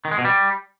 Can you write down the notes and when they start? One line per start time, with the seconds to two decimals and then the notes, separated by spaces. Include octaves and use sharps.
0.05 D#3
0.11 G#3
0.18 B2
0.25 G3